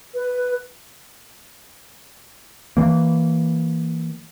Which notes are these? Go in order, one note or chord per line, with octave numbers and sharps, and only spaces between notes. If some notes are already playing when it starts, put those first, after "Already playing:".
B4
E3 A#3